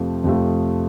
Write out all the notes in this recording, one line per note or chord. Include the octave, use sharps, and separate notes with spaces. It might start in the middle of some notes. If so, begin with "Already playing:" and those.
Already playing: F2 C3 F3 A3
F2 C3 F3 A3